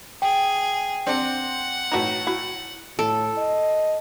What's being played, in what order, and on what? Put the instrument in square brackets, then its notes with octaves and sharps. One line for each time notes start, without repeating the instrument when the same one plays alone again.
[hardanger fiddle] G#4 [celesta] G5
[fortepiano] C4 D4 [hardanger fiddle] F#5
[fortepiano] A2 A#5 [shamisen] D#4 F#4 B4
[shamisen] E4 F#4
[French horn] A2 [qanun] A4
[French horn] D#5